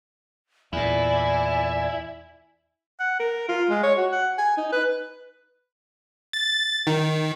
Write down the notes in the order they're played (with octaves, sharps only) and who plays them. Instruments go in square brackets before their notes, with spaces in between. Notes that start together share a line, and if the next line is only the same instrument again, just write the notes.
[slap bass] E2 A#2 [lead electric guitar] E4 [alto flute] D5 [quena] G#5
[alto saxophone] F#5
A#4
F4
G#3
C#5
F#4
F#5
G#5
D#4
B4
[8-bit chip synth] A6
D#3